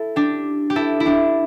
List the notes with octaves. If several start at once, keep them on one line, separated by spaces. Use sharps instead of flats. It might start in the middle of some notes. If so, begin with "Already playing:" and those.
Already playing: E4 A4
D4 G4
G4
E4 A4
E4
D4 G4